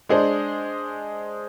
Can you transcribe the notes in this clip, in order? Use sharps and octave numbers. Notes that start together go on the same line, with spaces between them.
G#3 D4 G#4 C5